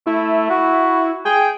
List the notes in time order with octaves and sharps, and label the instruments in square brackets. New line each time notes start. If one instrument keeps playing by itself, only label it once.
[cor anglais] A3 [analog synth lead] E4
[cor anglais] F#4
[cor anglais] G#4 [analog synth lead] G5